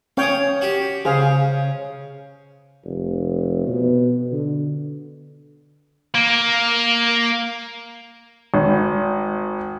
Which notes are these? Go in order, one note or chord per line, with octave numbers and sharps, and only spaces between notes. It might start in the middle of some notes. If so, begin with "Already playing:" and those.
C#4 C#5 F5 G5 D#6
F#4 G4
C#3 G#4 C5 F5
F1
B2
D3
A#3
G#1